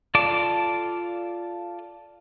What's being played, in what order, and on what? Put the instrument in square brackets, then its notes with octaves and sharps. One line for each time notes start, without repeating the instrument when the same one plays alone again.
[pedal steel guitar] F4 A4 D5 A5 D6